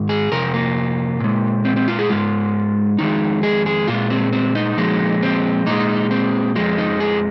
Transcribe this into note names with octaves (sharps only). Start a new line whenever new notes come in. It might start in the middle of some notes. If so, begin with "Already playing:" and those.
Already playing: G#2 D#3
G#4
F2 C3 A#4
A#3
A#2 G#3
C4
C4
F4
G#4
G#2 G#3 F4
F2 D#3 G#3 D#4
G#4
G#4
A#2 G#3 F4
C4
C4
D#4
A#2 F3 G#3
C4
A#2 G#3 D#4
C4
F2 F3 G#3
D#4
G#4